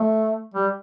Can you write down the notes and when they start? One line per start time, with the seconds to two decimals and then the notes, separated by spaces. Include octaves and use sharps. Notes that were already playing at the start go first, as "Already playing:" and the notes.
Already playing: A3
0.54 G3